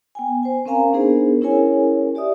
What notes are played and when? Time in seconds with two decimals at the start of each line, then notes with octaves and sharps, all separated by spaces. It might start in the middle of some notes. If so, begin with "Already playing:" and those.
0.15 B3 G5 G#5
0.43 C5 G#5
0.66 C4 C#4 A#4 F5 G#5 A#5
0.93 B3 D4 D#4 G#4 A#4 C5
1.41 C#4 E4 G#4 A#4 C#5 G#5
2.15 G4 D5 E5 D#6